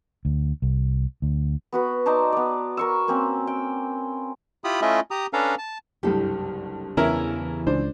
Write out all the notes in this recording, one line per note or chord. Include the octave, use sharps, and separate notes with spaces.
D2
C2
D2
B3 F#4 B4
D#4 C5 D5 A5
B3 D5
A#4 C#6 E6
A#3 C4 C#4
G5
E4 F4 G4 B5 D#6
A3 C#4 E4 F4 D#5 E5
G4 A#5 D#6
C#4 D4 A4 B4 F5 A#5
A5
F#1 C2 G2 G4 A4
E2 C#3 E3 C#4 E4 A#4
C#2 D4 C5